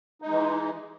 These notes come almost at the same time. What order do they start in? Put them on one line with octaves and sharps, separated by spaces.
D#4 G#3 E3